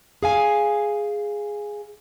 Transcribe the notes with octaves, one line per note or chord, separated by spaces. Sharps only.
G#4 F5 G#5